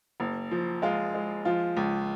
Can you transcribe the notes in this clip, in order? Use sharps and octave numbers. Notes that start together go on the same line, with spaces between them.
F#1
F3
G#3 F4
G#3
F3 F4
C#2